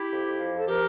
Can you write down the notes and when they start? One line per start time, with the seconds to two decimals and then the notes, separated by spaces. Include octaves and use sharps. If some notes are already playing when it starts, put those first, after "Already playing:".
Already playing: E4 G4
0.09 F2
0.24 F2
0.38 F3
0.53 F2 A4
0.67 F3 G4 A#4